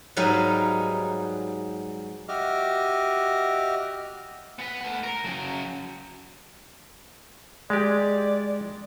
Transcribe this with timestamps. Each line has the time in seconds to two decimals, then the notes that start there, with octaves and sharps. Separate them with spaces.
0.16 G#2 F#3 G3 D#4 B4 F5
2.29 F#4 G4 D#5 E5 D6 F6
4.59 B3 B4
4.81 A3 F#5
5.03 A#4
5.25 C#3 F#3
7.70 G#3 G4 D5